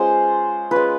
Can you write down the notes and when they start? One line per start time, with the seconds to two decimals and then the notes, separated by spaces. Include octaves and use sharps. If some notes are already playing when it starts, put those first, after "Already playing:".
Already playing: G#3 C#4 F4 C5
0.71 G#3 C#4 F4 B4